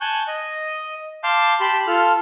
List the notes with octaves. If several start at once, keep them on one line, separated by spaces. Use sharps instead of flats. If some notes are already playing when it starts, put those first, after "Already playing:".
G#5 A5 C#6 F#6 G6
D#5
F5 A5 C6 D6 G6
G4 A5 B5 C6
F4 A4 F6